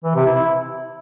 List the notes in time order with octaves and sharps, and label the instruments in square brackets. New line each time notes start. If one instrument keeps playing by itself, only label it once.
[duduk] E3
C3
E4